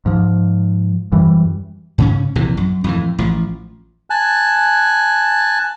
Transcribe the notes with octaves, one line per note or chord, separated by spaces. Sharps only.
G#2 F3
F#2 E3 G3
G#2 C#3 C#4
A#1 C3 E3
F#2
F2 A2 E3
A1 F3
G#5 A5 F#6